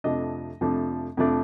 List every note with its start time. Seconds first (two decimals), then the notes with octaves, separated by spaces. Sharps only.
0.04 F2 C3 F3 A3 D4 D#5
0.61 F2 C3 F3 A3 D4
1.17 F2 C3 F3 A3 D4